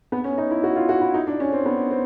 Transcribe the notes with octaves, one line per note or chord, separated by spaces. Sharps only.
B3
C#4
D#4
E4
F#4
F4
F#4
E4
D#4
D4
C#4
C4
B3
C4